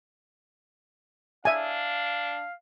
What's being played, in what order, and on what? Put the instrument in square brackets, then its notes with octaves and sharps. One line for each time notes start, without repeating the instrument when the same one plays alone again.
[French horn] D4 [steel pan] E5 G#5 [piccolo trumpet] F5